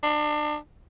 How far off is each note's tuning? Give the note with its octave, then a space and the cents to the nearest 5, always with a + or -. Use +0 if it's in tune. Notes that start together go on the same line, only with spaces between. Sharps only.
D4 +30